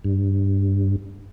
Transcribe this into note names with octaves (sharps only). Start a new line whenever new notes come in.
G2